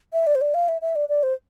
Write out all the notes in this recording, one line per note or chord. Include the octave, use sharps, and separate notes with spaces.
E5
D5
C5
D5
F5
E5
E5
D5
D5
C5